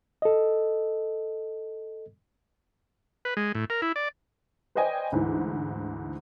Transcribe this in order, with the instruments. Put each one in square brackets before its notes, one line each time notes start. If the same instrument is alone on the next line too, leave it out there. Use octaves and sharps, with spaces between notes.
[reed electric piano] A4 D#5
[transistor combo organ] B4
G#3
A2
A#4
E4
D5
[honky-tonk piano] B4 C5 D5 D#5 G5 G#5
D2 G#2 E3